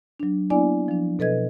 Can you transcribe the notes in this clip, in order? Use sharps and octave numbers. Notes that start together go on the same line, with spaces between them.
F#3 D4
A#3 B3 D4 E4 D5 G#5
F3 D4
B2 A4 B4 D#5 G#6